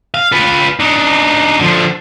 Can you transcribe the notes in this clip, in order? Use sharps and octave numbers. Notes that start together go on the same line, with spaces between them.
F5
F4 B4
D4 D#4
D3 F3